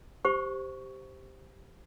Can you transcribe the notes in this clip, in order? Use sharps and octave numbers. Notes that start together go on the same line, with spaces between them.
G4 C5 C#6